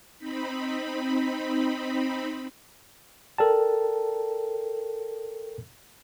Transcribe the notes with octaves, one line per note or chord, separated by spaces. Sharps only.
C4 D#4 B5
A4 A#4 D5 G5 A5